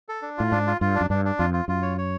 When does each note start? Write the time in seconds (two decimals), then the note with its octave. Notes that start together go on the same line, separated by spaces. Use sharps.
0.09 A4
0.22 D4
0.38 A2 F4
0.52 G#2 D4
0.67 F4
0.81 G2 F4
0.95 D4
1.01 F#2
1.10 G2 D4
1.25 D4
1.39 F2 F4
1.54 F4
1.68 F#2 F4
1.82 C#5
1.98 C#5